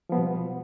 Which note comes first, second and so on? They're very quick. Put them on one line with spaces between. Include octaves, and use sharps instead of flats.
F3 B3 G3 B2